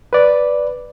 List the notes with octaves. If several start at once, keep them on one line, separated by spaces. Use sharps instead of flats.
B4 D5